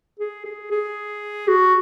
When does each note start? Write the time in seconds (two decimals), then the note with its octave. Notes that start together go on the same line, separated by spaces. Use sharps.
0.19 G#4
0.45 G#4
0.71 G#4
1.48 F#4